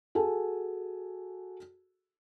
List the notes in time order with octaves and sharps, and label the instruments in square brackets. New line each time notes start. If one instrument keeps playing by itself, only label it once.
[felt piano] F#4 G#4 A4 G#5